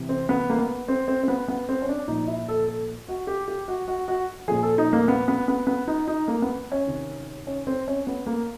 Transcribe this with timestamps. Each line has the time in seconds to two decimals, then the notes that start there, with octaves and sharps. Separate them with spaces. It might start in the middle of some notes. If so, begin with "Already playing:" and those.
Already playing: C3 E3
0.09 C4
0.29 B3
0.50 A#3
0.59 B3
0.88 C4
1.08 C4
1.23 C4
1.28 B3
1.48 B3
1.69 C4
1.82 C#4
1.89 D4
2.08 A#2 F3 D#4
2.27 E4
2.48 A4
2.67 A4
3.08 F#4
3.27 G4
3.48 G4
3.68 F#4
3.88 F#4
4.08 F#4
4.48 A#2 F3 G#4
4.63 A4
4.78 D#4
4.93 A#3
5.08 B3
5.28 B3
5.48 B3
5.67 B3
5.88 D#4
6.08 D#4
6.28 A#3
6.42 B3
6.72 C#4
6.87 C3 D#3
7.47 C#4
7.67 C4
7.88 C#4
8.07 B3
8.27 A#3